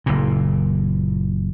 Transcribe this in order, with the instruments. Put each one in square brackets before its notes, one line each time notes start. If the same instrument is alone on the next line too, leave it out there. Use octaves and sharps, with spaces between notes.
[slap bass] F#1 A#2